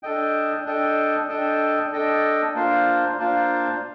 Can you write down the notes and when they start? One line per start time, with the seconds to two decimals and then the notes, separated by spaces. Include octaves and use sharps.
0.03 D4 A4 D#5 G5
0.65 D4 A4 D#5 G5
1.28 D4 A4 D#5 G5
1.92 D4 A4 D#5 G5
2.54 A#3 D4 F4 C5 F5
3.18 A#3 D4 F4 C5 F5